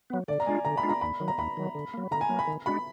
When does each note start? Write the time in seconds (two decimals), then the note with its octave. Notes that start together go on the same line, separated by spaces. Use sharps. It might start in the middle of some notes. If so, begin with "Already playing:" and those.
0.10 F#3 B3
0.28 D3 D5
0.40 A#5
0.46 G#3 D4 F4 G#5
0.65 D3 A#5
0.77 B5
0.83 G#3 D4 F4
0.89 A#5
1.01 D#2 B5
1.20 D#3 F#3
1.28 A#5
1.38 D#2 B5
1.57 D#3 F#3
1.75 D3
1.94 F#3 A#3
2.11 D3 A#5
2.21 G#5
2.29 F#3 A#3
2.39 B5
2.47 D#3
2.66 G#3 D4 F#4 B5